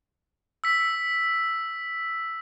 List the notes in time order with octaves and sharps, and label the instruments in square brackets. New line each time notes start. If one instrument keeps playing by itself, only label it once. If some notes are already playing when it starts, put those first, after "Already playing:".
[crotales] E6 B6